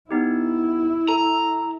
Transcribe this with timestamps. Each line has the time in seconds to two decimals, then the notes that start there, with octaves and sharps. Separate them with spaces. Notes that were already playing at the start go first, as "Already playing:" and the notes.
0.11 B3 D#4 E4 G4
1.08 A4 A#5